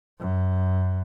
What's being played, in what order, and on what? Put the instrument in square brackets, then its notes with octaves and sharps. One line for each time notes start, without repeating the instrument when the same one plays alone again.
[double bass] F#2